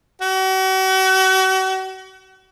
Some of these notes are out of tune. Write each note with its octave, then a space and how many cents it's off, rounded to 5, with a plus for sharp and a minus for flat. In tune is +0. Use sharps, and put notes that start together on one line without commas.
F#4 +40